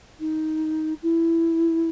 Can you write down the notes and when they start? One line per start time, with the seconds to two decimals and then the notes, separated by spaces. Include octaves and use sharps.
0.20 D#4
1.02 E4